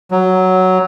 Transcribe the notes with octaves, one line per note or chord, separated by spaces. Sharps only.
F#3